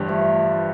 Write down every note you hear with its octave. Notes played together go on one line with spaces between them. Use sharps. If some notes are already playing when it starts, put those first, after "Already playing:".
Already playing: G1 G2 E3 G3
F3 A3